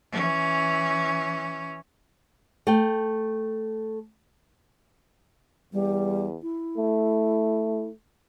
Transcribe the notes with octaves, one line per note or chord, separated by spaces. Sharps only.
E3 C#4
A3 G5
E2 G3
E4
A3